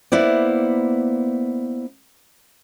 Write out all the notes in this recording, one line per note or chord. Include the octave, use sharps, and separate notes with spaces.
A#3 B3 E4 C5 D5